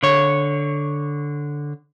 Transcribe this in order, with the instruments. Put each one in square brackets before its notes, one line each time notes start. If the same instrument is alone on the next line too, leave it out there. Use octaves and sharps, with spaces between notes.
[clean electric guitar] D3 C#5